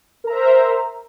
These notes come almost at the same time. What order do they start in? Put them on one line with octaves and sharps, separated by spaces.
A#4 A#5 E5 C5